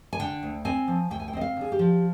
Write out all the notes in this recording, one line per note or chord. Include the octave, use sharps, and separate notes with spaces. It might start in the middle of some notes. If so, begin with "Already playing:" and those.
G#5
D3 G5
D2
C4 G#5
F3
D2 G5
G#5
G5
C4 D#5
F5
D3 G#4
G4
F3